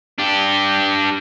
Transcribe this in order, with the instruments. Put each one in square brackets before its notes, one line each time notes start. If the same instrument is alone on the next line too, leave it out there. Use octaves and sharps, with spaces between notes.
[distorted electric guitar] D4 G4